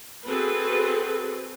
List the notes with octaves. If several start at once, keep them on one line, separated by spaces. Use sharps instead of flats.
C4 F#4 G#4 A4 B4